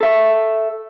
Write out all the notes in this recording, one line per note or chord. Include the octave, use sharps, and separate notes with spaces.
A4 E5